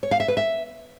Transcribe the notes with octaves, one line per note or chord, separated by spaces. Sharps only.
C#5
F5
E5
B4
E5